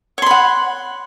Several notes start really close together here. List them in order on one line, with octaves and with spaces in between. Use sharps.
C#5 C6 B5 F#5